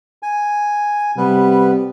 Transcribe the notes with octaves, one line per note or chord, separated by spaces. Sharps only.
G#5
C3 G3 B3 B4